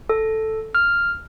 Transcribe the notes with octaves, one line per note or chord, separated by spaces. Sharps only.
A4
F6